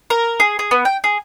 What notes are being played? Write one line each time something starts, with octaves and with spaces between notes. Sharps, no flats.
A#4
G#4
G#4
B3
G5
G#4